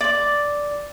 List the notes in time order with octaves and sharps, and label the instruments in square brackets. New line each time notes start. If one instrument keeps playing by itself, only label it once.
[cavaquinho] D5 D6